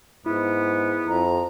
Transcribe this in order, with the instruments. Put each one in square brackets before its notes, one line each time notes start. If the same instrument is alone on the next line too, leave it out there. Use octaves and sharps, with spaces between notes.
[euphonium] G#2 [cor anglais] B3 [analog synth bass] E4
[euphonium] F2 [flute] A#5